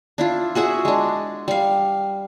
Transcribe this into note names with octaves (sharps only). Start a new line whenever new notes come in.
D4 E4 F4
F#4 G#4 E5 F#5
G#3 D4
G3 F5